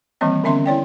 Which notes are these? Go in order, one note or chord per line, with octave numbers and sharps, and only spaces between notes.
D#3 E3 G3 A#3 C4 D#5
D3 B3 C#4 E5 C6
E4 C#5 D5 G5